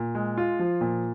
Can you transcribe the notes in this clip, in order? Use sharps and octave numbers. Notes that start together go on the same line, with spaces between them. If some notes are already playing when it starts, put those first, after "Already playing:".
Already playing: A#2
G#3
F4
F3
A#2